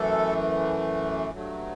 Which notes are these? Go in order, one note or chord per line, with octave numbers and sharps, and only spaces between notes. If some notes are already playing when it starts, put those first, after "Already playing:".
Already playing: F#2 E3 A3 A4
G2 F#3 A3